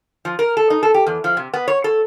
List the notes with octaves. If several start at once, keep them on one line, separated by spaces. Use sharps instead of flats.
F3
A#4
A4
D#4
A4
G4
E2
F3
C3
B3
C#5
A4